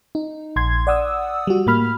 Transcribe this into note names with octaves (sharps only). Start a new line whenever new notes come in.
D#4
A#1 C6 G#6
D5 F#5 D#6 E6
G3 F#4
A2 A#3 B5 F6